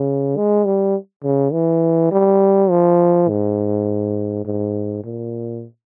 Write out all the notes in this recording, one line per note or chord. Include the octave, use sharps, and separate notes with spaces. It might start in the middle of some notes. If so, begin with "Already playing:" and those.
Already playing: C#3
G#3
G3
C#3
E3
G3
F3
G#2
G#2
A#2